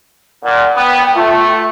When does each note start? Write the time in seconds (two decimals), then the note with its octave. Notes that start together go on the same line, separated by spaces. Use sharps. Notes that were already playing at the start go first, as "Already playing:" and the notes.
0.43 A#2 F#5
0.76 B3 G5
1.15 A3 F4